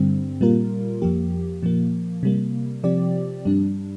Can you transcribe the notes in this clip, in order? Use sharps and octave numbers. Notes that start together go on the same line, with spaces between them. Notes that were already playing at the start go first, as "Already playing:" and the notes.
Already playing: G2 D3 G3 C4
A#2 G3 A#3 F4 A#4
F2 F3 A#3 G4
A#2 F3 A#3
C3 G3 A#3
C3 F3 C4 G4 D5
G2 G3 D4